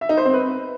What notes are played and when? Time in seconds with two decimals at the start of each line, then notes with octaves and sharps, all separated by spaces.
0.01 E5
0.09 D#4
0.17 C5
0.25 C4
0.33 B4